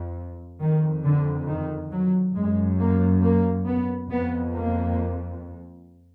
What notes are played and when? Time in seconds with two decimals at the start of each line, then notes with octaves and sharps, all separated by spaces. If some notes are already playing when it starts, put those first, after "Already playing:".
Already playing: F2
0.60 F2 D#3
1.04 D3
1.48 D#3
1.91 F#3
2.35 F#2 G#3
2.80 A#3
3.23 A#3
3.67 B3
4.11 F2 B3
4.55 A#3